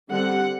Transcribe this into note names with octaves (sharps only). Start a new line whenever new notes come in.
D3 G3 C4 F#5